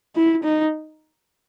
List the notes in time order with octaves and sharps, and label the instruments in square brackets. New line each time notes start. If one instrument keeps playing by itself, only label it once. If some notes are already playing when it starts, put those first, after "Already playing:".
[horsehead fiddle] E4
D#4